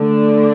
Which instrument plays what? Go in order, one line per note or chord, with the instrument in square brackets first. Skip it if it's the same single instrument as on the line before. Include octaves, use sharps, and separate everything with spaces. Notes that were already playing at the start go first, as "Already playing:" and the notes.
Already playing: [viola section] D3 A3 D4